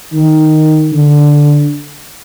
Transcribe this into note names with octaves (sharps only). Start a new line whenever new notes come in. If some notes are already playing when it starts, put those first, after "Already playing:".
D#3
D3